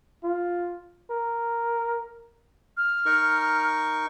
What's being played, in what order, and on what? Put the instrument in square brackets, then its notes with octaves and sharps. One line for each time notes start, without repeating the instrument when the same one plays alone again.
[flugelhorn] F4
A#4
[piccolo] F6
[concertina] D#4 A#4 C#6